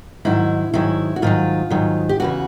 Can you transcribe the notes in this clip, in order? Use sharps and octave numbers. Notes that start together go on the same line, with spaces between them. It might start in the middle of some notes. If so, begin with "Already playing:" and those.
G#2 D#3 F#3 E4
G#2 D#3 F#3 E4
F#4
G#2 D#3 F#3 F4
G#2 D#3 F#3
G4
E2 C#3 E3 F#4